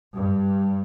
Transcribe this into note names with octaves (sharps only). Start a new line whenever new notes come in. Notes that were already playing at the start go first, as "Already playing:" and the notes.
G2